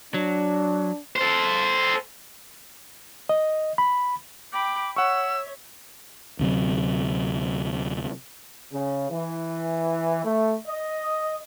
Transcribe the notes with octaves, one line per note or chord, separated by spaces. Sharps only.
F#3 D4
A4 C5
D#5
B5
G5 B5 D6
C#5 E5 F#5 C#6 E6
D2 C3 F#3
C#3
E3
A3
D#5